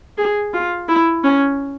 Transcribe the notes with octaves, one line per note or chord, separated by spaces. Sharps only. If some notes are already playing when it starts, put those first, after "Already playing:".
G#4
F4
E4
C#4